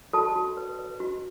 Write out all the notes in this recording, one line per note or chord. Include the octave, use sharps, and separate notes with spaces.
F#4 A4 A5
F#4
B4
B4
F#4